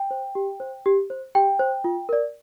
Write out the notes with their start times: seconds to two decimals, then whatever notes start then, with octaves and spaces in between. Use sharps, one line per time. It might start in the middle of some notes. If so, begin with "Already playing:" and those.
Already playing: G5
0.11 C5
0.35 G4
0.60 C5
0.86 G4
1.10 C5
1.35 G4 G5
1.60 C5
1.84 F4
2.09 A#4 D5